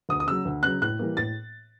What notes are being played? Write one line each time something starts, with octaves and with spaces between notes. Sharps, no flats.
D2 D#6
D#6
C#3 F#3 E6
D2
C#3 F#3 F#6
A2 F#6
E3 G3 A#3
A2 A6